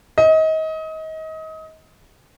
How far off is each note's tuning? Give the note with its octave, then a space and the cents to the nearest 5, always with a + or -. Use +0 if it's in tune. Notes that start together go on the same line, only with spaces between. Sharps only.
D#5 +30